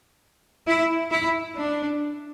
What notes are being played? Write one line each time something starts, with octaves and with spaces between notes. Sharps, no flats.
E4
E4
D4